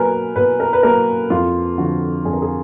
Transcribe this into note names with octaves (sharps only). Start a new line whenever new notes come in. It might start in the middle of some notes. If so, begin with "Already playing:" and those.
Already playing: B2 F#3 A#3 A#4 B4 G#5
B2 B4
A#4
B4
F#3 A#3 A#4
F2 F4
D3 F3 F#4
F2 G#4
A#4
G#4